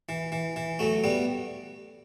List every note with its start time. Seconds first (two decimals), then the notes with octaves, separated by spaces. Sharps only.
0.09 E3
0.32 E3
0.56 E3
0.79 F#3 A3
1.04 G3 B3